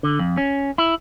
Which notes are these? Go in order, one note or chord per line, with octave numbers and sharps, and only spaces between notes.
D3
F2
C#4
E4